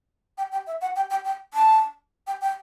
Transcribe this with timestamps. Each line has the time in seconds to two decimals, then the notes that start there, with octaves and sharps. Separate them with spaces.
0.38 G5
0.52 G5
0.67 E5
0.81 F#5
0.96 G5
1.10 G5
1.25 G5
1.54 A5
2.27 G5
2.41 G5